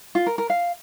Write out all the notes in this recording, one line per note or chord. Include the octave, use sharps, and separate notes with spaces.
F4
A#4
A#4
F5